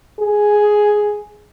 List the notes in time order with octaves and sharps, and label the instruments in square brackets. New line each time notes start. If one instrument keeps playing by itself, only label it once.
[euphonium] G#4